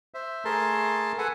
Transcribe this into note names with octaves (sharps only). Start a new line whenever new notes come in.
C5 E5
A3 G#4 A#4 A5 C6
A4 B4 F#5 G#5